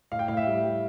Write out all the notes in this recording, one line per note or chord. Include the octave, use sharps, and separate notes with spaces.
A2 F5
G5
A2 F5
E5
G3
G3